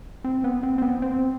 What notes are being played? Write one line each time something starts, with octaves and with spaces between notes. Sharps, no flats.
C4
B3
C4
C4
B3
C4